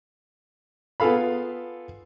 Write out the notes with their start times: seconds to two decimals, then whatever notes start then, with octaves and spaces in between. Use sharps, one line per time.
1.00 B3 F4 G#4 A4 F5 B5